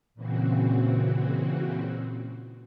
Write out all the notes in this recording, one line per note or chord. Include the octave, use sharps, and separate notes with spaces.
A#2 C#3 E3 C4 F#4